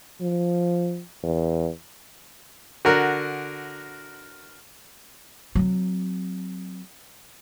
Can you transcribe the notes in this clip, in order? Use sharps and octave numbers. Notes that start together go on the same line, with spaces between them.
F3
E2
D3 F#4 A#4
F#3 C4